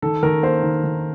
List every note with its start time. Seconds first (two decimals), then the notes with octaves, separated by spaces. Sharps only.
0.02 D#3 A4
0.23 D#3 A#4
0.43 A#3 C5
0.63 D#3
0.84 D#3